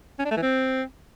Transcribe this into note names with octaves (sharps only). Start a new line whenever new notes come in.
C#4
D4
A3
E3
C4